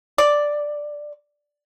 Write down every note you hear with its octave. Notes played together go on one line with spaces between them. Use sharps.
D5